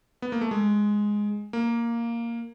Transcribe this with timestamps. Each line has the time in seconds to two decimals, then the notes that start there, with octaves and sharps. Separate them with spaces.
0.22 B3
0.32 A#3
0.41 A3
0.51 G#3
1.53 A#3